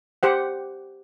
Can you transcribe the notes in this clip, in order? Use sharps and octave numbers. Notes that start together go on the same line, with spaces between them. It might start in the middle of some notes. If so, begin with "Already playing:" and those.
G4 C5 F#5